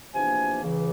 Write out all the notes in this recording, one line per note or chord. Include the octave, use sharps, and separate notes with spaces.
E2 C3 F3 A#3 D4 G#5
C#2 C#3 E3